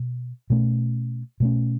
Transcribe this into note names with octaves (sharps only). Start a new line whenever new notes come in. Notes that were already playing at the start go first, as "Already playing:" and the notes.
Already playing: B2
B2 A3 C#4
B2 A3 C#4